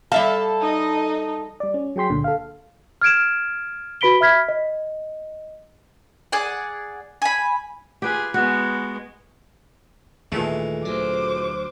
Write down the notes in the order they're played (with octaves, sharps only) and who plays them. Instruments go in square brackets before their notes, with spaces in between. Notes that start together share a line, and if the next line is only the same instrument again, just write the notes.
[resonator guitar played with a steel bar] G3 E5 F5 [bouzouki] A4
[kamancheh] D#4 D#5
[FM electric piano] G3 D5
C#4
F#3 G#4 G5 C6 B6
C#2 A#2 D3
A4 F5
[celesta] F6 G#6 D7 E7
F#4 B4 B5 B6 D7 G7
E5 B5 F6 G#6 B6
D#5
[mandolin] G#4 D5 F#5
G#5 B5
[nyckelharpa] F4 G#4 [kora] G4 B4
[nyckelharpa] G#3 B3 [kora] F#4
[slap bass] D#2 [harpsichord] A#2 E3 G#3 [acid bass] A3
[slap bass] D2 F#3 [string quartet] C5 D6